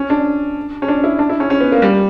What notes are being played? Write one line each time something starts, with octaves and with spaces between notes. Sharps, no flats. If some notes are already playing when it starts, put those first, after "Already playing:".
Already playing: C#4
D4
C#4
D4
E4
D4
E4
C#4
C#4
B3
A#3
G3